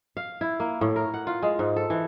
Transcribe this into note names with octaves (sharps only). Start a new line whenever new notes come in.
F5
E4
A#3
A2
A#4
F#5
F4
G#3
G#2
A4
E3